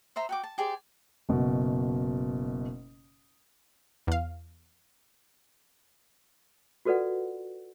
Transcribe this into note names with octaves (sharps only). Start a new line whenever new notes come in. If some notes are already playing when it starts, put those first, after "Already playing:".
C5 E5 A#5 C6
F#4 G5 D6
A5
G4 G#4 C5 D5
F#1 B2 F#4
E2 F5
F4 F#4 A4 B4 D5 F#5